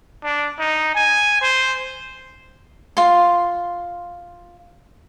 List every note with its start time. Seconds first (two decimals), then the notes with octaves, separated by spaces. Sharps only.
0.24 D4
0.59 D#4
0.95 G#5
1.41 C5
2.97 F4 C6